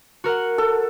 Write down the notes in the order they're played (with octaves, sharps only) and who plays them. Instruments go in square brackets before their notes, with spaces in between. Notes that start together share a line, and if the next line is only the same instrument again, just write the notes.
[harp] F#4 A#4 F#5
[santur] A4